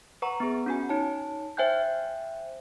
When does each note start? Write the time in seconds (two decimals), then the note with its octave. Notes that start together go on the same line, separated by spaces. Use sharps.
0.22 B4 F#5 A#5 C#6
0.40 B3 G#4
0.66 C#4 F#4 G#5
0.89 D#4 C#5 A5
1.57 C5 E5 G5 G#5 F#6 G6